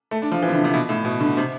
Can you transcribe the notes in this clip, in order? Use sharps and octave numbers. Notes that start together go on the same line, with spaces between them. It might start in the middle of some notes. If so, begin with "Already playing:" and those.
A3
D4
F3
E3
C3
D3
C3
B2
A2
B2
D3
C3